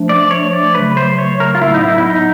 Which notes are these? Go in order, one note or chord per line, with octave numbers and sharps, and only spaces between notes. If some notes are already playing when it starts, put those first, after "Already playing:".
Already playing: F3 A3 D4
D5
C#5
D5
C#3 F#3 A3 B4
C5
C#5
A#4
F4
A2 F#3 B3 E4
D#4
E4
E4
D#4